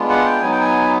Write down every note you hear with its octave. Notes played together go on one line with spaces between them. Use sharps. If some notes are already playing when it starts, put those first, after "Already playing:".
Already playing: G#3 B3 D4 F4
F#5
G5
F#3 B3 D#4 G#5
G5
G#5